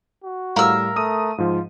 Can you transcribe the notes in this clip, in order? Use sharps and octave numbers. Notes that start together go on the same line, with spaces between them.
F#4
A2 G3 A#4 F5 E6
A3 D#6 D#7
G#2 F3 F4